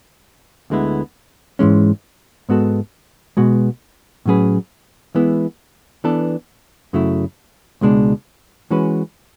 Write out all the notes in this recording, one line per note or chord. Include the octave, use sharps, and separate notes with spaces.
D2 D3 G#3 B3 E4
G#2 E3 G#3 C#4
G#2 G#3 B3 F#4 A4
B2 G#3 B3 F#4
A2 F#3 C#4 G#4 B4
E3 G#3 B3 E4
E3 B3 D4 A4
F#2 C#3 F#3 A3 E4
C#2 B2 G#3 D4
E3 G#3 C#4 F#4 B4